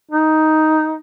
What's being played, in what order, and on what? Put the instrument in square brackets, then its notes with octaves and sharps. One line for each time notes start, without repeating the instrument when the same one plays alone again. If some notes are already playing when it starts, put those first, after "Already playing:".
[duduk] D#4